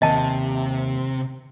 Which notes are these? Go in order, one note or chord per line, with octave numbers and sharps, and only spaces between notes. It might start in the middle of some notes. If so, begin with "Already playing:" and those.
D#2 C3 D#5 A5